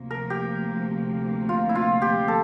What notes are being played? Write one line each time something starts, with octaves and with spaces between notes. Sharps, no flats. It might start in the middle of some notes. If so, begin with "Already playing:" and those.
Already playing: D2 C3 F3 A#3
A#4
G4
F4
E4
F4
G4
A4